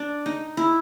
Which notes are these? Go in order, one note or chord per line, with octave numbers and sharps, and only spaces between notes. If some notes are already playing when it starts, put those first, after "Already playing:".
Already playing: D4
D#4
E4